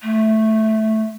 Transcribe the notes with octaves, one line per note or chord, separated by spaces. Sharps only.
A3